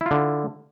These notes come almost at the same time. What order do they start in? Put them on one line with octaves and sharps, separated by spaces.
E4 F4 D3